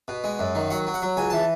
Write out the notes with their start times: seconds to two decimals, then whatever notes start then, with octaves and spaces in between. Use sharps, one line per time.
0.08 B2
0.24 G#3
0.39 F#2
0.55 D#3
0.70 F#3 F#5
0.87 F#3
0.94 F#5
1.02 F#3
1.17 C#2 G#5
1.30 E3 A5